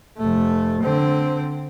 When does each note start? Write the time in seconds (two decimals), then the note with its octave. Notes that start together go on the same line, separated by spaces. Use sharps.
0.17 F1 A3
0.82 D3 C4